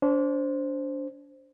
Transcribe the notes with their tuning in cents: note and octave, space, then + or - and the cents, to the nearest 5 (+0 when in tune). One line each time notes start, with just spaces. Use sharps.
D4 -30 C5 +0